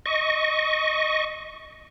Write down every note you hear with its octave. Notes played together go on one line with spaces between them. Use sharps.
D#5 C#6